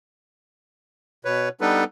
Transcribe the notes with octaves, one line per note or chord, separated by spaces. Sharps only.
B2 B4 C#5
G3 B3 D4 D#4 A4 B4